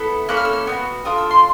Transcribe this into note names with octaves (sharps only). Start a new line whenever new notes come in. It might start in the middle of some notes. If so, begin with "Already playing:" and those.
Already playing: B3 E4 A4
A#3 C#4 E4 A4 F#6
F6
E6
F6
B3 D#4 F#4
D4 F4 A4 D#6
E6
C6